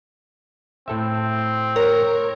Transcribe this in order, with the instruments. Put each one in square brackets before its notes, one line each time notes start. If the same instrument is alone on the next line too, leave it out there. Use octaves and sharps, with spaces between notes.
[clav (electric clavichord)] A2 A4 E5 [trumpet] C4
[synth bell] A#4 [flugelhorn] C#5